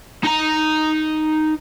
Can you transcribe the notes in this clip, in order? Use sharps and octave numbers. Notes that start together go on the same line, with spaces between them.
D#4 A#5